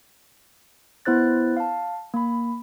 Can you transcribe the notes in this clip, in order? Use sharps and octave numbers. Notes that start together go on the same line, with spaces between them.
B3 E4 C5 F#6 A6
F5 A5
A#3 B5